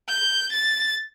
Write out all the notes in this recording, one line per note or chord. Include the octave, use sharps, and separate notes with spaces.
G6
A6